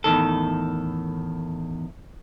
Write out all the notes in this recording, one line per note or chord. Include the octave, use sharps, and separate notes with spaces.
E2 A2 D#3 A4